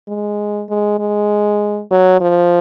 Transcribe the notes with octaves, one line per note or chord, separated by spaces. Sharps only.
G#3
G#3
G#3
F#3
F3